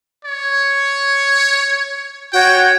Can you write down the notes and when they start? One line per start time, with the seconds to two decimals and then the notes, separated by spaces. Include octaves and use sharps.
0.25 C#5
2.33 F#4 C#5 G5